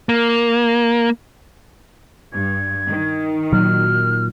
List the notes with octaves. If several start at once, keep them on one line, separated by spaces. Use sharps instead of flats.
A#3
G2 G#6
D#3
A#2 F#3 F6